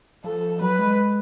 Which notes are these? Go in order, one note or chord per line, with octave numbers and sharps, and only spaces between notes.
F3 A4
F#3 B4
G#3